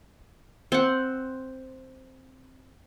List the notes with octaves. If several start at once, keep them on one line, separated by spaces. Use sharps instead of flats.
C4 F#5